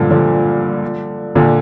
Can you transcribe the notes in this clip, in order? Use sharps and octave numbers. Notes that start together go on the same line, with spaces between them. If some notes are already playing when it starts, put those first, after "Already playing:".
Already playing: G2 A#2 D3 F3
D3 F3
A#2 D3